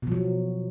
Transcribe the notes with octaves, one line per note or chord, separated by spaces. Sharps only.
B2 F3 F#3